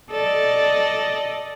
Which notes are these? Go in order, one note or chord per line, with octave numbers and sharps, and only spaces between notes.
A4 D5 D#5